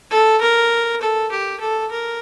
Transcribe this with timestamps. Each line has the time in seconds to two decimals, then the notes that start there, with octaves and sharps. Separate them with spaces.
0.11 A4
0.41 A#4
1.01 A4
1.31 G4
1.60 A4
1.91 A#4